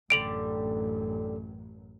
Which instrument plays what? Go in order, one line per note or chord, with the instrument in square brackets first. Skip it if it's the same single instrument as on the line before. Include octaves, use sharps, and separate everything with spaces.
[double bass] A1 F#2 [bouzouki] D3 G3 [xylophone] D7 F7 F#7